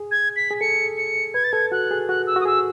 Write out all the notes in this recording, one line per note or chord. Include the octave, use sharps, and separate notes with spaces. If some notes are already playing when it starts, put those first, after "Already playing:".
Already playing: G#4
G#6
B6
G#4
A4 C#7
C#7
B4 G#6
A6
A4 G#6
F#4 F#6
G#4
F#4 F#6
E6
F#4
D#6
G#4 E6